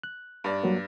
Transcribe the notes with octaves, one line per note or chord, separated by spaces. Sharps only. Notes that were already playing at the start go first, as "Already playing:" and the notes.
F#6
G2 D5
F#3 G3 A#3